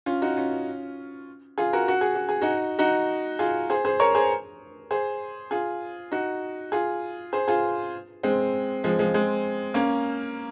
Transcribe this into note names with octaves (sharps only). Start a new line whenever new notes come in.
C#4 F4
D#4 F#4
C#4 F4
F4 G#4
F#4 A#4
F#4
G#4
F#4
G#4
D#4 F#4
D#4 F#4
F4 G#4
G#4 C5
G#4 C5
A#4 C#5
G#4 C5
G#4 C5
F4 G#4
D#4 F#4
F4 G#4
G#4 C5
F4 G#4
G#3 C4
F3 G#3
F3 G#3
G#3 C4
A#3 C#4